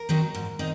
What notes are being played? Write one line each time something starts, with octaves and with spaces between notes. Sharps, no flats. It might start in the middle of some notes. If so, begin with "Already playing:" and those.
Already playing: A#4
D#3 F#3 C4 D#4
G#2
D#3 C4 D#4